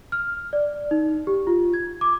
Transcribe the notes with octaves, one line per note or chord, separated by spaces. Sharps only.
F6
D5
D#4
G4
F4
G#6
D6